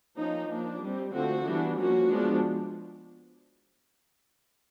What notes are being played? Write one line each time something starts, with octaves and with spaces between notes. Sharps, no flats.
F3 A#3 C#4 D#4
F3 A#3 D4
G3 C4
D3 F3 A3 C4 F#4
E3 G3 B3 D4
F3 A#3 C#4 F#4
F3 G#3 B3 D4